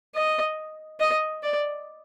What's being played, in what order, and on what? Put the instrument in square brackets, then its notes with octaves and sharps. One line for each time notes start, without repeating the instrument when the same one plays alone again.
[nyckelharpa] D#5
D#5
D5